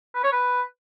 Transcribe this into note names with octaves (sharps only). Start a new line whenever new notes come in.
B4
C#5
B4